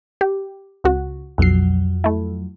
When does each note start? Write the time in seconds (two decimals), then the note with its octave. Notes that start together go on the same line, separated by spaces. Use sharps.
0.21 G4
0.84 C#2 F#4
1.38 B1 F2 F#3 C7
2.04 A3 E4